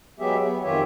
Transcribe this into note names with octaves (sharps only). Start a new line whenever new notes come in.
F#3 G#3 B3 G4 G#4 E5
B3
F2 D#3 F4 G4 C#5 E5